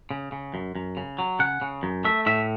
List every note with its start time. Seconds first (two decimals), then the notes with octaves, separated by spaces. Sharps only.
0.11 C#3
0.32 C#3
0.54 F#2
0.75 F#2
0.97 C#3
1.19 F#3
1.39 C#3 F#5
1.62 C#3
1.83 F#2
2.04 A3 E5
2.26 A2 E5